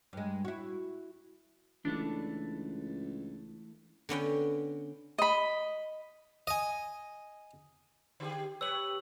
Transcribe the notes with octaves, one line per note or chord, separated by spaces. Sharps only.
G2 G#3
E4 F#4
C#2 E3 A3 D4
D3 B3 C#4 G5
D#5 B5
D#5 G#5
D3 G4 G#4
G4 B4 C#5 E6 F#7